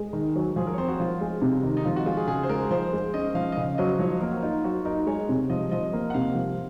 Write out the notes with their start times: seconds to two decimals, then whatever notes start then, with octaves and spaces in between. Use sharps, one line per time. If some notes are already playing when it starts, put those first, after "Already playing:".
Already playing: G#3
0.13 D#3
0.36 F#3
0.56 F3 G#4
0.67 A#4
0.74 C#5
0.78 C4 C5
0.88 F#4
1.00 F3 F4
1.21 G#3
1.42 C3
1.63 D#3
1.77 D#4
1.85 F3 F4
1.96 F#4
2.06 G#3 F4
2.17 G#4
2.27 C#3 G#4
2.43 C5
2.49 G#3 A#4
2.71 F3 C5
2.93 G#3
3.14 C#4 D#5
3.35 F3 F5
3.52 D#5
3.57 C#3 F5
3.78 F#3 D#5
3.99 F3 C#5
4.10 C5
4.21 A#3 A#4
4.32 F#4
4.42 D#4 F4
4.64 F#3 F#4
4.85 D#4 A#4
5.07 G#3 C#5
5.29 C3
5.50 F3 D#5
5.71 F3 D#5
5.93 A#3
6.10 F#5
6.14 C3 F5
6.35 F3